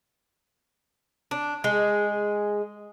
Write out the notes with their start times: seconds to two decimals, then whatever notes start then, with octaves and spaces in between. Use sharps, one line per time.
1.31 D4
1.64 G#3 G#4